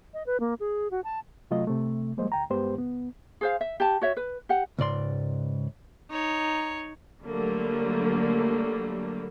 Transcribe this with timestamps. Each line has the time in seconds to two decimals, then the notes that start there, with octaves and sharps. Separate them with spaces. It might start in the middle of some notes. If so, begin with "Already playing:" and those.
0.14 D#5
0.26 B4
0.40 A#3
0.60 G#4
0.91 F#4
1.04 A5
1.51 C3 F#3 A3 F4 D#5
1.67 C3 A3
2.17 F3 G3 G#3 A#3 C5 D#5
2.32 D2 G5 A#5
2.50 G2 G#3 B3 G4 B4 C5
2.75 C#2 B3
3.41 G#4 C5 F5
3.61 E5
3.80 G4 A5
4.01 F#4 C#5 E5
4.17 B4
4.49 G4 F#5
4.79 C#2 G#2 D5 C6
6.11 D#4 C#5
7.23 D3 F#3 G3 A3 A#3